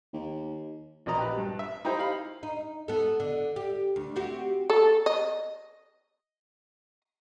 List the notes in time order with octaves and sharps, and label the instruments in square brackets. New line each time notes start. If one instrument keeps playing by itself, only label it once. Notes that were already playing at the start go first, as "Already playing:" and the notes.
[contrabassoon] D#2
[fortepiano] A#1 B2 D5 D#5 A#5
G4 B4
G2
E5
D#4 E4 G4 C5
F5 B5
[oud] D#4
B3 A4
D3
G4
D2
C4 F#4 G4
[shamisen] A4
D#5